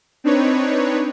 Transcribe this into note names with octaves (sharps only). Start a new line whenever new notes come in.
C4 D4 D#4 B4 C#5